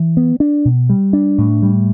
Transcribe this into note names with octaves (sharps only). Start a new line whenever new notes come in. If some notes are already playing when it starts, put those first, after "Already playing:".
Already playing: E3
B3
D4
B2
G3
D4
A2
G3